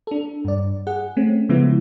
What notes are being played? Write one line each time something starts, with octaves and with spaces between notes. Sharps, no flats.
D4 A4
G2 D5
G#4 F#5
A3 C4 C#4
C#3 F3 G#3 B3 E4